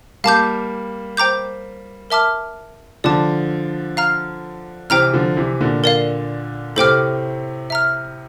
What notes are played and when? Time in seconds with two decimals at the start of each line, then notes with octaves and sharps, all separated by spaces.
0.24 G3 A#3 F5 A5 D6 G6
1.17 C5 G5 A#5 D6 G6
2.10 A#4 E5 A5 D6 F6
3.04 D3 F3 D5 A5 D6
3.97 F5 A#5 F6
4.90 C3 E3 C5 G5 A#5 F6
5.13 D3 F3
5.37 C3 E3
5.61 A#2 D3
5.84 A#4 D5 F5
6.76 A2 C3 A4 C5 G5 D6 F6
7.70 E5 A#5 F6